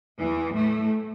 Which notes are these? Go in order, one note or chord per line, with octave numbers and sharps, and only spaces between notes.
E2 E3
A2 A3